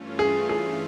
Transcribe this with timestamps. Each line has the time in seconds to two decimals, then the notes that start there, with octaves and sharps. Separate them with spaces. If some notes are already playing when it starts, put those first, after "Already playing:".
Already playing: G2 E3 A3 C#4 F4
0.19 G#4
0.49 G#4